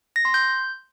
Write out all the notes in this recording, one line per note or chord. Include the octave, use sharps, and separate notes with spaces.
A#6
C6
G6